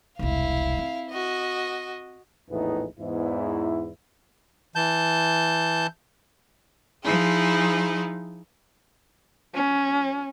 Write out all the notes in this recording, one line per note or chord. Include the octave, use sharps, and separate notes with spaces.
E1 C2 E4 F5
C4
F#4 D#5
A#1 E2 A2 E3 B3 D#4
E2 G#2 E4
E3 A5 G6
F3 D#4 E4 G#4
C#4